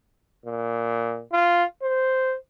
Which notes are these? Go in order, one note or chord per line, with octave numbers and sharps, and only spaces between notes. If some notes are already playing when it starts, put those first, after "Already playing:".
A#2
F4
C5